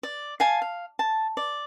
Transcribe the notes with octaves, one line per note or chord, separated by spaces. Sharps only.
D5
F5 G#5 A5
F5
A5
D5